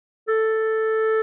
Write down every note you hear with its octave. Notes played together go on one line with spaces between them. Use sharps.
A4